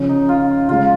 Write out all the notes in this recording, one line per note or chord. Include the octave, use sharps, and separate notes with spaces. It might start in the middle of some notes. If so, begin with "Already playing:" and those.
Already playing: C#3 F3 C#4
D#4
F4
C#3 G#3 C#4 F4